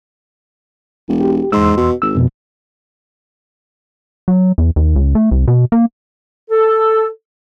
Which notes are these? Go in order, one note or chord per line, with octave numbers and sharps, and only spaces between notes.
E1
G4
E2 G#2 C6 E6
B2
G#1 E6
F2 B2
F#3
E2
D#2
C#2
A3
C2
B2
A#3
A4